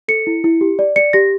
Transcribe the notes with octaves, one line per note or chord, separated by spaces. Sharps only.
A4 C#7
E4
E4
G4
D5
D5 C#7
G4 A#6